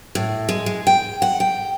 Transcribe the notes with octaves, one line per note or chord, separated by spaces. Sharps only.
A2
G#3
G#3
G5
F#5
G5